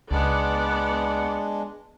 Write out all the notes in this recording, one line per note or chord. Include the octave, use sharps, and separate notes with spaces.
C#2 G#3 B3 D4 D5 F#5